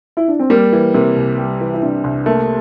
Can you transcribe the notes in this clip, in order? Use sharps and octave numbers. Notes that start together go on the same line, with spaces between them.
E4
D4
C4
G3 A#3
E3
C3 A#3
C2
G3
E3
E4
C3 D4
C2
A3 A#3